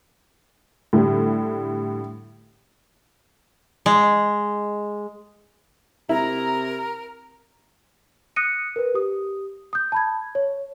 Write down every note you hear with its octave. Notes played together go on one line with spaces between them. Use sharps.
A2 D3 G3
G#3
C3 E4 A#4 A#5
D#6 F#6 A#6 C#7 D#7
A#4 B4
G4 D#6
D#6 G6
A5 B5 G#6
C#5